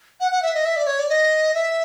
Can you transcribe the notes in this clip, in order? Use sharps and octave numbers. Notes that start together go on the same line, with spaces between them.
F#5
F#5
E5
D#5
E5
D5
C#5
D5
D#5
E5